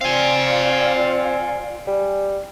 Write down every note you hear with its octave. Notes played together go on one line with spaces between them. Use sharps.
C4 F4 D5 F5 G#5
G3